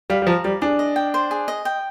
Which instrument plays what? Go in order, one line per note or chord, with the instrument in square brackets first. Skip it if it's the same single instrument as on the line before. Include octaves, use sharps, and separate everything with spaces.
[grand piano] G3 [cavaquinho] F5
[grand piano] G3
[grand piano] F3 [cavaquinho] A#5
[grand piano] G3 [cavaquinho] D5
[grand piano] D4 [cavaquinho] G#4
[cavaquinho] D#5
G5
C5
G#4
D#5
G5